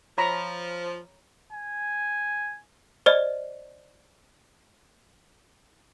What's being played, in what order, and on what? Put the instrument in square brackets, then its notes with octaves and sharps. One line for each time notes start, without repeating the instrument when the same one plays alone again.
[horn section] F3 [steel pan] C#5 A#5 B5
[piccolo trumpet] G#5
[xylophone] C5 D5 D#5